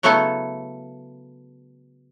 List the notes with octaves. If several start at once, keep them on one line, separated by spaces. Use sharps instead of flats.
C#3 F#3 A3 B3 E4 A4